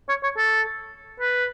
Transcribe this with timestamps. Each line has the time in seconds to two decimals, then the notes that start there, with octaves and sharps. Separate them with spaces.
0.09 C#5
0.24 C#5
0.37 A4
1.20 B4